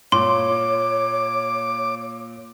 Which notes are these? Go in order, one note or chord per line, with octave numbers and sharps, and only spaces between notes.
A#2 C#5 C6 D6